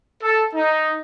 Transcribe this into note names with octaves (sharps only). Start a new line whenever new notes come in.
A4
D#4